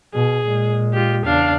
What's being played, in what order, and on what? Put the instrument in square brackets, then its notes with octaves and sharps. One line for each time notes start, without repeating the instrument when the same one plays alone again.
[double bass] B2 [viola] G#4
[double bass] A#2 G#3
[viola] F4 G4
[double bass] E2 C#3 [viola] D4 F5